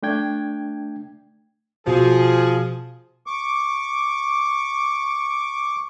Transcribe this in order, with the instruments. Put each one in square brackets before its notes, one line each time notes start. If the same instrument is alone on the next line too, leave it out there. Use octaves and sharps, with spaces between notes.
[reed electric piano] A3 D4 G5 G#6
[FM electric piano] B2 F#4 [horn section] F3 G#4
[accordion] C#6 D6